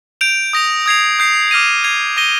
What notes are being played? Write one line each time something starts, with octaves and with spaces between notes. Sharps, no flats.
G6 D7 F7
D#6 A#6 F7
D#6 G#6 C7 F7
D#6 G6 C7
D6 F6 A#6 D#7
G#6 C7 F7
D#6 A#6 D#7 G7